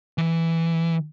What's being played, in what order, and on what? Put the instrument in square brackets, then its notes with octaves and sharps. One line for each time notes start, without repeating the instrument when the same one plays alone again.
[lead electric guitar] E3